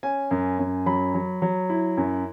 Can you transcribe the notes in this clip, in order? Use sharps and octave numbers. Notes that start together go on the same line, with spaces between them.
C#4 G#5
F#2
F#2
F#3 B5
F#3
F#3
E4
F#2